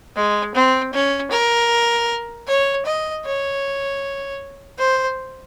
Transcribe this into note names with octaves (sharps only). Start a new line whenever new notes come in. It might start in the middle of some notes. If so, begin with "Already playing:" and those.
G#3
C4
C#4
A#4
C#5
D#5
C#5
C5